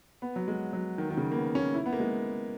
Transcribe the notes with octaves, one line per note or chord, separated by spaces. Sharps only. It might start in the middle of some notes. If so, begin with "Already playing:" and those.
B3
F#3
G#3
F#3
D#3
D#3
C#3
A#3
B3
C#4
E4
B3
A#3
G#3